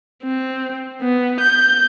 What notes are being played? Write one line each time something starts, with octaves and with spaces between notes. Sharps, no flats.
C4
B3
G6